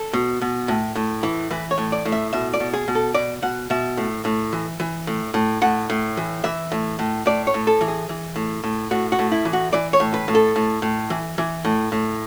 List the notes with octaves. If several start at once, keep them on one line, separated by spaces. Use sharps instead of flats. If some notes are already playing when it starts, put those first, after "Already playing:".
Already playing: A4
B2
B2
A2
A2
E3
E3 B4
C#5
A2
D5
A2
E5
B2 E5
D5
B2
G#4
B2
A4
B2 D5
B2 F#5
B2 E5
A2
A2
E3
E3
A2
A2
A2 F#5
A2
E3
E3 E5
A2
A2
A2 D5
C#5
A2
A4
E3
G#4
E3
A2
A2
A2 F#4
F#4
A2
E4
E3
F#4
E3 D5
C#5
A2
B4
A2
A4
A2
A2
E3
E3
A2
A2